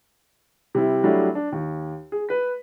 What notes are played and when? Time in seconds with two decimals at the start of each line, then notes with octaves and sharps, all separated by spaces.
0.75 C3 G3 E4
1.04 F#3 G3 A3 D4 E4
1.35 D4
1.52 D#2
2.12 G#4
2.29 B4 B6